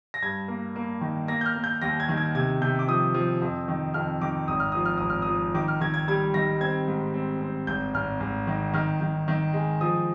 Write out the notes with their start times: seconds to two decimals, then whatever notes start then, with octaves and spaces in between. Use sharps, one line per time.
0.14 A#6
0.22 G2 G#6
0.48 A#3
0.76 A#3
1.01 D#3
1.28 A#3 A#6
1.41 G6
1.46 F6
1.56 A#3
1.64 G6
1.82 D#2 A#6
2.00 G#6
2.09 D#3
2.17 G#6
2.35 C3 G#6
2.62 C3 G6
2.79 D6
2.88 F3 D#6
3.14 F3
3.42 F2
3.68 D#3
3.94 F2 F6
4.21 D#3 D6
4.48 G#1 D#6
4.60 F6
4.72 F3 D#6
4.85 F6
4.97 G#1 D#6
5.10 F6
5.22 D#6
5.28 F3
5.54 D#3 D6
5.68 F6
5.81 D#3 G#6
5.94 G#6
6.08 G3 G#6
6.34 D#3 A#6
6.61 C4 G#6
6.88 G#2
7.14 C4
7.41 C4
7.67 G#1 G6
7.94 G#1 F6
8.20 G#1
8.47 D#3
8.74 D#3 F6
9.01 D#3
9.28 D#3
9.53 G#3
9.81 F3 D#6